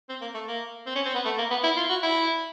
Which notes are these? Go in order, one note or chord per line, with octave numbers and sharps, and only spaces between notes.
C4
A#3
A3
A#3
C4
C#4
C4
B3
A3
A#3
B3
E4
F4
F#4
E4